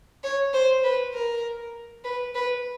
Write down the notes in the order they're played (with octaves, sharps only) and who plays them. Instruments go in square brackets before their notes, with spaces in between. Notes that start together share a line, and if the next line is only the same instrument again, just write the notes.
[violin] C#5
C5
B4
A#4
B4
B4